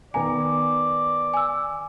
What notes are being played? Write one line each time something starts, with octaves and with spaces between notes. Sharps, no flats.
D#3 B3 D5 G#5 A#5
G#5 E6